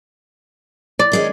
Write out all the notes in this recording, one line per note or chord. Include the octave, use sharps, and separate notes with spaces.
D5
D#3 G#3 C#4